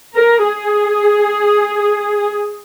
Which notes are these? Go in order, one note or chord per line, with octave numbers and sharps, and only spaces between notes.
A#4
G#4